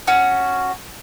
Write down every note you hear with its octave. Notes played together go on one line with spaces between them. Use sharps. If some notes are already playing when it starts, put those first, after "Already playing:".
C#4 F#4